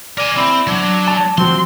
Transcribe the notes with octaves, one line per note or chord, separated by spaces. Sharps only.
A#4 D5 G#5
C4 E4
F#3 D4
A5
F3 C4 F#4 C6